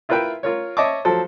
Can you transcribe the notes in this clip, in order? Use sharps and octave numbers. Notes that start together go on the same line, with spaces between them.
E4 F4 A#4 B4 E5 G5
F4 A#4 C#5
C#5 D#5 E5 A5 C#6 D6
F3 F#3 A4 C5